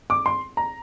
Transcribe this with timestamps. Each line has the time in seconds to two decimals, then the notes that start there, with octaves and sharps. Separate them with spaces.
0.10 D6
0.26 C6
0.57 A#5